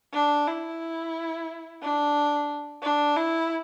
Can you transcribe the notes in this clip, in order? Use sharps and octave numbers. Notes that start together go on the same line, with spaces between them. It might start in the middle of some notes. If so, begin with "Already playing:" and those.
D4
E4
D4
D4
E4